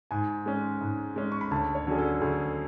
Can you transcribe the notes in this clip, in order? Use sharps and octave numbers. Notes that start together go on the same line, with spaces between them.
G#2 G#5
G#3 C#4
G#2
G#3 C#4
C#6
B5
D2 A5
C#5
D3 F#3 C#4 G#4
A4
D2 G#4